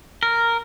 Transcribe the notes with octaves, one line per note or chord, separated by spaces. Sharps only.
A#4